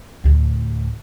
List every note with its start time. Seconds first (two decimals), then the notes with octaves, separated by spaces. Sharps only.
0.24 D2 A2